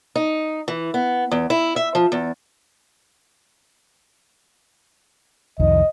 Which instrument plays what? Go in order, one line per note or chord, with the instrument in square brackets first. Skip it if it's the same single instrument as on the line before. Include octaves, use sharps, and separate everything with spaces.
[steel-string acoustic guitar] D#4
E3
B3
E2
E4
E5
F3
E2
[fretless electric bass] C2 F2 D#3 [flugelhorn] D#5